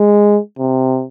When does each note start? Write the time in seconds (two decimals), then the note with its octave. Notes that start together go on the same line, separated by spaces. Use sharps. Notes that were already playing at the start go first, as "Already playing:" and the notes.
Already playing: G#3
0.59 C3